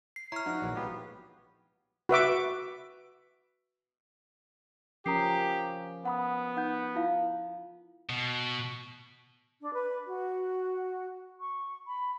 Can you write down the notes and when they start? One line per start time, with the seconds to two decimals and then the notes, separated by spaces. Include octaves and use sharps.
0.16 C7
0.32 E4 C#5 A#5 F6
0.45 F3 D4 D#4 F#4
0.62 A#1 E3 F#3
0.76 G#3 B3 F4 G4
2.09 F#4 B4 E5 D6
5.06 F3 C#4 G4 A#4 A#5 D#6 C7
6.05 B3 F#5 B5 D#6
6.57 D#4 F#5 G6
6.96 E4 F4 F5
8.09 B2
9.60 D4
9.73 B4
10.07 F#4
11.40 C#6
11.87 B5